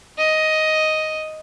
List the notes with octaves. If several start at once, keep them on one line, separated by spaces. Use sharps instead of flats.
D#5